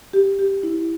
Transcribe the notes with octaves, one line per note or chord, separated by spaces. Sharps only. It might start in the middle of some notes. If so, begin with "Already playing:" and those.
G4
G4
E4